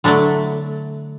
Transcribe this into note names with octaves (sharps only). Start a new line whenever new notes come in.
D3 F#3 A3 D4 E4